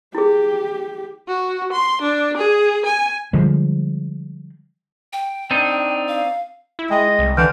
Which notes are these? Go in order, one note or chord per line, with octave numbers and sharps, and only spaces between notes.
E4 G4 G#4
F#4
C6
D4
G#4
G#5
D3 F3 G3 G#3
G5
C4 D4 D#4
F5
E4
G#3 D#5 G5
C2
D3 E3 F6 G6